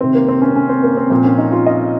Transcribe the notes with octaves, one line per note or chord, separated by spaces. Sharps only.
C3 D#3 C4
A#3
C4
C#4
C#4
C4
A#3
C4
A#2 F3 C4
C#4
D#4
F4
D#5